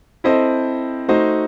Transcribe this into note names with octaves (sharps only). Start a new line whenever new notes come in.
C4 E4 A4 C5 D#5
A3 D#4 F#4 C5 D#5